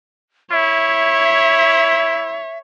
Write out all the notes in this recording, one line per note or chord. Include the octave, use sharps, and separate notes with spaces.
E4 C#5 E5